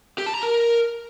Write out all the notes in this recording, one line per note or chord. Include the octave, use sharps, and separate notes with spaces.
G4
A5
A#5
A#4